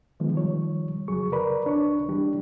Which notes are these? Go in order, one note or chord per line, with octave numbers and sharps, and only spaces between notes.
D3 D#3 F3 G#3 B3
D#3 F3 G3 C#5
F2 C#3 F#3 G#4 C#6
A#4 B4 D5 B5
C#2 D4 C#5 C#6
E3 G3 D4 G4